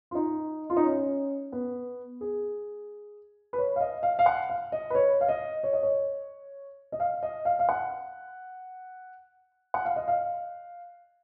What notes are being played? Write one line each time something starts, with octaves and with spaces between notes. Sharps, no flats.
F4
D#4
F4
D#4
C#4
B3
G#4
B4
C#5
F5
D#5
F5
F5
F#5
F5
D#5
B4
C#5
F5
D#5
C#5
D#5
C#5
D#5
F5
D#5
F5
F5
F#5
F#5
F5
D#5
F5